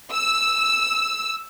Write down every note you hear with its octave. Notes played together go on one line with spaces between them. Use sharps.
E6